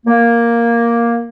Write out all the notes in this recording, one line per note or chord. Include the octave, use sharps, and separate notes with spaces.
A#3